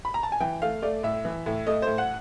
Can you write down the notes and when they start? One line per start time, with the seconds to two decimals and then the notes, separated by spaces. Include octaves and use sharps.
0.05 B5
0.14 A#5
0.23 A5
0.32 G#5
0.40 E3 G5
0.62 A3 F5
0.82 A3 D5
1.03 A2 E5
1.25 E3
1.46 A2
1.67 A3 D#5
1.82 A2 C5
1.98 F#5